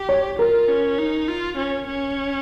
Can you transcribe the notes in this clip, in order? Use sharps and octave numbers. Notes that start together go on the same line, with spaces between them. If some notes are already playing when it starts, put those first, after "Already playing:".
Already playing: G4
C#5
F4 A#4
C#4
D#4
F4
C#4
C#4